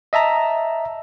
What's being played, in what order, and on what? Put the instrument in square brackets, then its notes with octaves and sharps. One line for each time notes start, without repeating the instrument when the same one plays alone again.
[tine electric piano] D#5 E5 A5 A#5